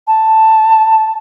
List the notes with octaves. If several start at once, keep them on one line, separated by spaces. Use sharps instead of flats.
A5